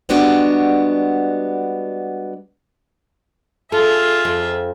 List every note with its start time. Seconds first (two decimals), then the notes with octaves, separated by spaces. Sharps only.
0.09 G3 G#3 B3 D4 F#4 G4
3.72 F4 G#4 A4 E5
4.25 F2